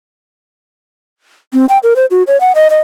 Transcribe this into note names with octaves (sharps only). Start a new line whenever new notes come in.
C4
G5
A#4
C5
F#4
C#5
F#5
D#5
D#5